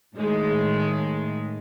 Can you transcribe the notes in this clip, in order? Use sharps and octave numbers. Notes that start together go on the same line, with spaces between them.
A2 D#3 G#3